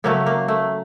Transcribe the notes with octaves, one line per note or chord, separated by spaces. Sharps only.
C#3 F#3 A3 A#3
A#3
A3